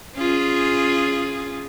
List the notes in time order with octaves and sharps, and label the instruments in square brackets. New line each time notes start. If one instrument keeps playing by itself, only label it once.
[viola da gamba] C#4 F4 G#4